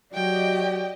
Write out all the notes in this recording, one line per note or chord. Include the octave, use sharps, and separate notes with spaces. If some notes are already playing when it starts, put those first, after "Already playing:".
F#3 G4 D5 D#5 G5